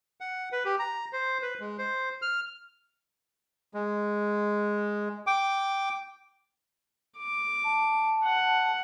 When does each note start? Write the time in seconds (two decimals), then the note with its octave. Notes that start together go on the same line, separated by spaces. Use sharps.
0.21 F#5
0.52 B4
0.65 G4
0.79 A#5
1.13 C5
1.42 B4
1.60 G#3
1.79 C5
2.22 F6
3.74 G#3
5.27 G5 D6
7.18 D6
7.64 A5
8.24 F#5